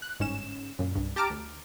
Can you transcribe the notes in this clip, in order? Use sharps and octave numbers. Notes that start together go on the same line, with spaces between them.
F#6
G1 G#2 C#4 E7
F#2 A#2
C2 G2
G4 A5 A#5 D6 F6 D7
D2